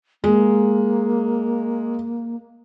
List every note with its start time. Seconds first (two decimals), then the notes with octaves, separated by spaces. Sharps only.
0.24 G#3 A#3